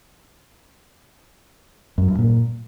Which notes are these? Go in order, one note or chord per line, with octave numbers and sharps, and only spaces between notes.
F#2
G2
A#2